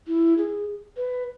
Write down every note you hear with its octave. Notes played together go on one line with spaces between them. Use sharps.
E4
G#4
B4